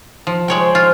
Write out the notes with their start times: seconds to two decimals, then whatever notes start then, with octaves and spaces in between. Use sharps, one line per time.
0.27 F3
0.48 G#3 C#5 G5
0.60 C5
0.75 F4